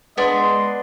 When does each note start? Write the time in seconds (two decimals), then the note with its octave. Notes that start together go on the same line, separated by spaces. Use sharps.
0.18 G#3 B3 D4 D#5 C6